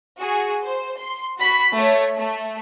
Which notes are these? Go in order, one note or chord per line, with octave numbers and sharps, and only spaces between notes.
F#4 G#4
C5
C6
F#4 B5 B6
A3 C#5
A3